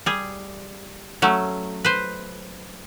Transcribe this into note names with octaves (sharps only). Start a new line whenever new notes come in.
G3 G#4
F#3 A3 C#4
B4 C5